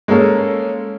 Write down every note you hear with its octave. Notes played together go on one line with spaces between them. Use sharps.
G#3 A#3 C#4 A4